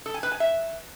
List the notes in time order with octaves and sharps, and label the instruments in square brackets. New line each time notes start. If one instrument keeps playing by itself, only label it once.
[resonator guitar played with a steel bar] A4
G#5
B4
G#5
E5